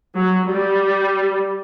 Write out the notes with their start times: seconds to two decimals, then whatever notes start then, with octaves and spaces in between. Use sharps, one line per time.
0.15 F#3
0.47 G3